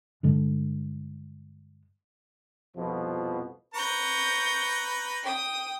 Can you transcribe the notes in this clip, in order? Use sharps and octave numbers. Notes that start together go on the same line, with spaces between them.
G2 D3 G#3
C2 F2 B2 F3
B4 A#5 C#6 G6
G5 D#6